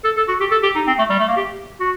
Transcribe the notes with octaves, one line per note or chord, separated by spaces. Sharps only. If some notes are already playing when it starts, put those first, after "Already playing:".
A4
A4
F#4
G4
A4
G4
D#4
C4
A3
G3
A3
A#3
G4
F#4